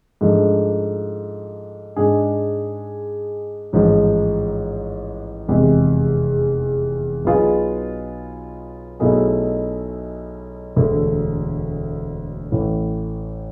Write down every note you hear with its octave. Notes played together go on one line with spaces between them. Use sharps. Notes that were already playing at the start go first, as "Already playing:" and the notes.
G#2 F3 A3 D4
G#2 G#3 D4 G#4
A1 G#2 F3
F1 E2 C3 G#3
B1 B2 B3 F4 G#4
B1 B2 A3 E4 G#4
E1 D2 D3 A3
A1 A2 E3